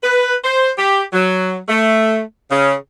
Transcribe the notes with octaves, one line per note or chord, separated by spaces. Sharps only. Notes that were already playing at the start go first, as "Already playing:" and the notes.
B4
C5
G4
F#3
A3
C#3